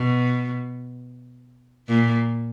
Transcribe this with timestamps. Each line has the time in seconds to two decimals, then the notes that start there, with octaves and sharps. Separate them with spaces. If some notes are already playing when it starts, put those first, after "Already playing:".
Already playing: B2
1.88 A#2